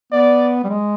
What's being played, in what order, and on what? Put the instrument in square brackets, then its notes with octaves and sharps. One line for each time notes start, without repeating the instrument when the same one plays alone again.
[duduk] B3 [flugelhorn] D5
[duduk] G3
G#3